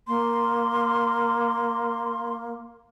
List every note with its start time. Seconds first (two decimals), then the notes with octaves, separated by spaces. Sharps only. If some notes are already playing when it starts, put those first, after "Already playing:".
0.08 A#3 C6